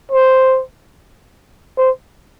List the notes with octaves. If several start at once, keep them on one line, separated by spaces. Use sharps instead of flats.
C5
C5